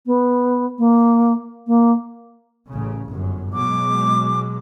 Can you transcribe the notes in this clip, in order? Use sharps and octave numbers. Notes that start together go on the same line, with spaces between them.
B3
A#3
A#3
A1 C#3
G1 F#2
B2 F#3 G#3 D6